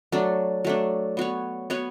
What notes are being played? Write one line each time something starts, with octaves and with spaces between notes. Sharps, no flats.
F#3 A3 D4
F#3 A3 D4
B3 F#4 C#5
B3 F#4 C#5